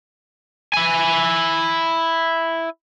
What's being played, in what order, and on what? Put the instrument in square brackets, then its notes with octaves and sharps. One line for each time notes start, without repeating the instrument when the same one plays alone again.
[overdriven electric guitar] E4 G#5